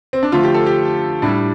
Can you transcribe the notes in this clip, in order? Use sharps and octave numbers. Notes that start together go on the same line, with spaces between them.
C4
D4
D3 F3 A3 F4
G4
A4
G4
A2 G3 D4